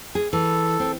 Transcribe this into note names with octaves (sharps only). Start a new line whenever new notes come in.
G#4
E3 A4
C4